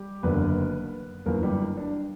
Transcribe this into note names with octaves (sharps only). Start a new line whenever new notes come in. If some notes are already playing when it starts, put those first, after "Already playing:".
Already playing: G3 G4
F#1 F#2 D3 B3 B4
G1 F#2 E3 A#3 A#4
G3 G4
D4